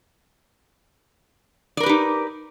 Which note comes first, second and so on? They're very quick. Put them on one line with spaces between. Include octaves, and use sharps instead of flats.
D5 A#4 B4 G4 D#4